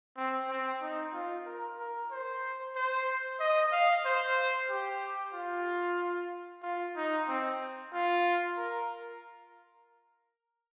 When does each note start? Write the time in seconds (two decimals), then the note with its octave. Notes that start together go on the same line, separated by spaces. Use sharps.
0.17 C4
0.49 C4
0.82 D#4
1.14 F4
1.46 A#4
1.78 A#4
2.11 C5
2.76 C5
3.40 D#5
3.72 F5
4.05 C5
4.70 G4
5.34 F4
6.63 F4
6.96 D#4
7.28 C4
7.93 F4
8.57 A#4